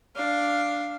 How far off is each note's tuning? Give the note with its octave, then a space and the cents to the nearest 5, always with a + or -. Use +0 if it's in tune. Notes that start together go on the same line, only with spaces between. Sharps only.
D4 +0 F5 +0